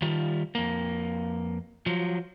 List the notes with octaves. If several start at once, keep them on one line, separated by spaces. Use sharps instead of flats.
D#3 G3 F4
F2 A#3
F3 F#3